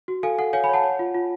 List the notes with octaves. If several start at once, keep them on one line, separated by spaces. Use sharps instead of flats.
F#4
A4 F5 G#5
A4 F#5
C#5 F5 G#5
G#5 B5
C#5 F#5 A5
C#5
F4
F4